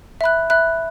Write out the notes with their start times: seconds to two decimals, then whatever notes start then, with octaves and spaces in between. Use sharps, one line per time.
0.21 E5 B5 F#6
0.50 E5 B5 F#6